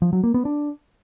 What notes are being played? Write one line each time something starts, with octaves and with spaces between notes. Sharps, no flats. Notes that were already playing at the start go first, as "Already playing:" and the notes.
F3
F#3
A#3
B3
D4